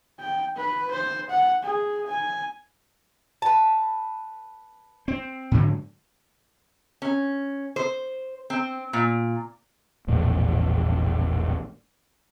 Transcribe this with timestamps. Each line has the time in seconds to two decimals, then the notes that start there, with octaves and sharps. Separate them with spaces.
0.20 G5
0.57 B4
0.91 C5
1.30 F#5
1.63 G#4
2.07 G#5
3.42 B4 A5
5.08 C4
5.51 G#2 D3 F#3
7.02 C#4
7.76 C5
8.50 C4
8.93 A#2
10.07 E1 A#1 E2 A2